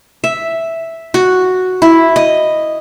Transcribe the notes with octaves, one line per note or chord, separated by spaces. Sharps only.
E5
F#4
E4
D#5